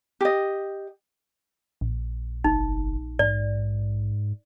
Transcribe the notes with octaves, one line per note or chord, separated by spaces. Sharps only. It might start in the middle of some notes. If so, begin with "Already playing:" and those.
G4 D#5
A#1
F#1 D#4
G#2 D5